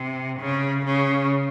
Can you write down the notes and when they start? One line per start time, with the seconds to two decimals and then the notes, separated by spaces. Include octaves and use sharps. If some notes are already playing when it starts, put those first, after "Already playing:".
Already playing: C3
0.39 C#3
0.85 C#3